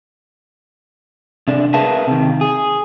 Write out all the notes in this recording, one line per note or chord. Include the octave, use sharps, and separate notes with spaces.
C3 D4
G#4 A#4 B4 E5 F5 A5
C3 D#3
G#4